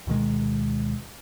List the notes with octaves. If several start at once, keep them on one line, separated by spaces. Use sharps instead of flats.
D2 B2 D#3 G#3